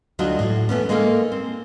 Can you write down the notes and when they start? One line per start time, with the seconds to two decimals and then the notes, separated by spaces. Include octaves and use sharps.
0.19 D2 F#3 D4 F4 F#4 D#5
0.39 A2
0.69 E3 A3 B3 C#4
0.89 G#3 A#3 D#4 A4 A#4 G#5
1.32 C4